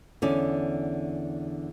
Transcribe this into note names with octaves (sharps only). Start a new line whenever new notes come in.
E2 D3 C#4 D5